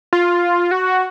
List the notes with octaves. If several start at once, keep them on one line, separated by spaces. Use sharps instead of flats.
F4
F#4